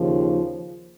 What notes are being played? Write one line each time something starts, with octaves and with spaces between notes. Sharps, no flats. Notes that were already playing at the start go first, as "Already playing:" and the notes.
Already playing: D#2 C#3 F3